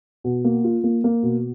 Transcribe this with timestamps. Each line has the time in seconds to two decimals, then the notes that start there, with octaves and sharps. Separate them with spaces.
0.24 B2
0.44 A#3
0.64 F4
0.84 A#3
1.04 A#3
1.23 B2